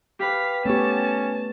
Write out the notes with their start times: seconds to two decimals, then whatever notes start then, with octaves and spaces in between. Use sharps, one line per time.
0.19 G4 B4 F5 B6
0.66 A3 B3 C#4 G4 C#5 A5